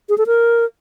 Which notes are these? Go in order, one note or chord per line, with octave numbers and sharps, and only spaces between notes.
G#4
A4
A#4